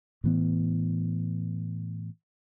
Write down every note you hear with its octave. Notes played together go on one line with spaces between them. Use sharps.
A2 E3 B3